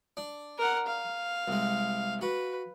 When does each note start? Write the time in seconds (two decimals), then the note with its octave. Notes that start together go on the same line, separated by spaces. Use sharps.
0.17 D4
0.58 A#4 F#5
0.87 F5
1.48 C2 G#3
2.21 F#4 B4